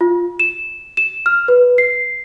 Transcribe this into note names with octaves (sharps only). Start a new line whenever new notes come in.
F4
E7
E7
F6
B4
C7